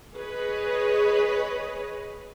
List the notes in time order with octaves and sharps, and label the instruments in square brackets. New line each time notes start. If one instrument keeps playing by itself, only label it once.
[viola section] G#4 B4 C#5 D#5